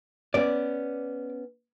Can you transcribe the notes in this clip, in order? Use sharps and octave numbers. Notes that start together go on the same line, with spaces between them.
B3 C#4 D5